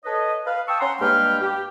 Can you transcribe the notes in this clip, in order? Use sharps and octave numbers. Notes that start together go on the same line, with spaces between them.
A4 B4 C#5 D#5
B4 F5
G5 A5 C#6 D#6 E6
C#4 F#5 A#5 C6
G2 G#3 A#3 B4 G5 F6
G4